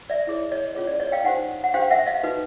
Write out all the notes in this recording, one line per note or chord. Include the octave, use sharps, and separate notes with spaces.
D5 E5
E4 G#4 C#5
C#5 D#5
C#4 F4 G#4 C#5
D5
C#5 D#5
F5 G5
D#4 G4 C5 F#5 G#5
F#5
D4 G4 C5 F5 G5
E5 F#5
D#5 F5
D#4 F#4 B4